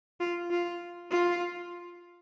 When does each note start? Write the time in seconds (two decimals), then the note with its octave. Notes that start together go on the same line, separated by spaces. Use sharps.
0.20 F4
0.51 F4
1.11 F4